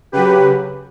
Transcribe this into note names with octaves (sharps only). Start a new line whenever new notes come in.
C#3 F#3 G4 B4